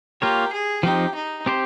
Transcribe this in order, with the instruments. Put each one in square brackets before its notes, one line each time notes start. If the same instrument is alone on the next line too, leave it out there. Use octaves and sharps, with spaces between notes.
[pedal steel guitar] A#3 F4 A#4 C#5 [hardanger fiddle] G4
[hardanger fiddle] G#4
[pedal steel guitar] F3 C4 D#4 [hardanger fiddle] G4
[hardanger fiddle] D#4
[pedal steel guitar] C4 G4 C5